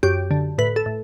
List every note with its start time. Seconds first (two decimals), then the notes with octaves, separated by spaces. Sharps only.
0.03 F#2 G4
0.31 D3
0.58 A2 B4
0.76 A4
0.86 A2